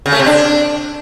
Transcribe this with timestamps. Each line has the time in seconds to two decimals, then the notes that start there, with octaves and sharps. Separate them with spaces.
0.06 C#3
0.13 A3
0.19 C3
0.26 D4